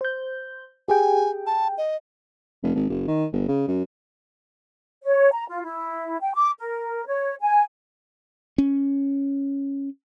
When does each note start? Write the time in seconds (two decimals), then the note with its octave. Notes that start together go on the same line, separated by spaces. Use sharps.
0.01 C5 G6
0.88 G4 G#4 G5 G#5
1.47 A5
1.78 D#5
2.63 F1
2.75 G#1
2.90 F#1
3.07 D#3
3.33 G1
3.48 C#3
3.68 F#2
5.03 C#5
5.33 A#5
5.49 F4
5.64 E4
6.21 G5
6.34 D6
6.60 A#4
7.06 C#5
7.42 G#5
8.58 C#4